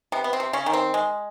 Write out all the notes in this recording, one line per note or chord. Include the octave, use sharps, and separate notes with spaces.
C3 B3
B3
C4
C3
C#3 C#4
D#3
C4
G#3